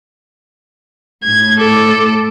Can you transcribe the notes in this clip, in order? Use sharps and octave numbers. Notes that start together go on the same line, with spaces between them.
A2 G#6
A4 D6